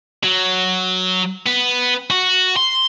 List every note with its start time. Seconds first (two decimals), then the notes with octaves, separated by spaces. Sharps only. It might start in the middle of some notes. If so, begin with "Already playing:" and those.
0.24 F#3
1.46 B3
2.11 F#4
2.56 C6